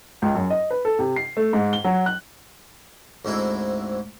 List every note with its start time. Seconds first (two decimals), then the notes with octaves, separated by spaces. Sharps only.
0.22 C#2
0.35 F#2
0.50 D#5
0.71 B4
0.85 A4
0.99 C3
1.16 C7
1.37 A3
1.53 G#2
1.73 G7
1.84 F#3
2.06 F#6
3.25 D2 G#2 C4 E4